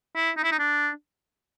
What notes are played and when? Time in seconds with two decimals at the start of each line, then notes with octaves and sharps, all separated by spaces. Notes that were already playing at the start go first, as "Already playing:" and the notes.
0.15 E4
0.37 D#4
0.44 E4
0.51 D#4
0.59 D4